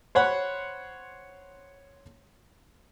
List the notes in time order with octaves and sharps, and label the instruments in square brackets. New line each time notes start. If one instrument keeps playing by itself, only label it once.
[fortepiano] C5 C#5 F#5 B5